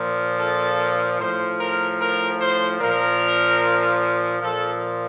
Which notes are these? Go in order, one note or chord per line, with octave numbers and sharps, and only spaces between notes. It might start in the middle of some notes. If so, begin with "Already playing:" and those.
Already playing: A#2 F3
A4
A2 F3 C5
A#4
A#4
C5
A#2 F3 A#4
A#2 F3 A4